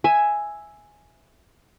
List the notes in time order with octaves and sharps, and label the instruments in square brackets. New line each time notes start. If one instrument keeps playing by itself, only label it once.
[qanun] E5 G#5